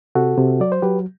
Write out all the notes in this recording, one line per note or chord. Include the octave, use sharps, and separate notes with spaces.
C3 F#4 A4
C3
F#3 D5
C5
F#3 G4 B4